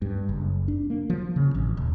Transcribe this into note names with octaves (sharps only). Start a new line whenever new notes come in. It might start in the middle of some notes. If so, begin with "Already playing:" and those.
G2
F#1
D4
A#3
F3
C#3
A1
D#1